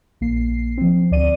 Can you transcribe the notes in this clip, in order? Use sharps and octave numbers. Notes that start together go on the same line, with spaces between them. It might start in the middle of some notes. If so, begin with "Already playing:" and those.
A#1 A#3 C7
F3 C4
D2 D5 D#7